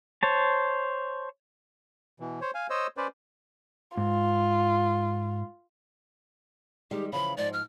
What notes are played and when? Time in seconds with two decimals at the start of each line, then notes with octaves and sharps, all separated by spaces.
0.23 C5 C#5 A5
2.20 B2 E3
2.41 C5 C#5
2.54 F5 G#5
2.70 C5 C#5 D#5 E6
2.97 C#4 B4 C5 D5
3.97 G#2 F4
6.91 D#3 G3 G#3 G4
7.12 C#3 E3 F3 B5
7.37 G#2 F3 D5
7.53 F6